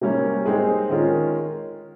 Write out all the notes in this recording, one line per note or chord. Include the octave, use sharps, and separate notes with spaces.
C3 G3 A#3 C#4
G#3 C4 D#4 G#4
D#3 G#3 C#4 F4 A#4